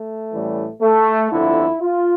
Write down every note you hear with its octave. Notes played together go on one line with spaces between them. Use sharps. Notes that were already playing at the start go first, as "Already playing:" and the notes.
Already playing: A3
A1 A2 E3 G3
A3
G1 F2 D3 E4
F4